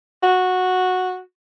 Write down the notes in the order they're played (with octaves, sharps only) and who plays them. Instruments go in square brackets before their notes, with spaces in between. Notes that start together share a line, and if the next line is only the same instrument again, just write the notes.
[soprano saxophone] F#4